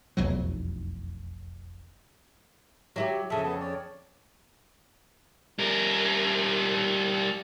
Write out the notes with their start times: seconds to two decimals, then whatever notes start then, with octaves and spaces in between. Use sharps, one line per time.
0.17 F1 B1 E2 F#3
2.96 F#3 E4 G4
3.30 F2 C#3 A4 E5
3.44 B3 A4
3.60 C#5 D5
5.59 G3 A#4